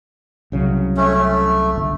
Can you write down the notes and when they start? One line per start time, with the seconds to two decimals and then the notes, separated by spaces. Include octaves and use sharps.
0.52 C2 C#3 F#3
0.97 A3 C#4
1.14 A3
1.76 G1